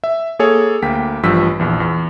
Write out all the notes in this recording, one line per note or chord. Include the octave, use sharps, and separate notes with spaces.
E5
A#3 G#4 A4 C#5 G#5
D2 A#3 G5 B6
A1 G2 F3 E6 B6
A#1 E2
E2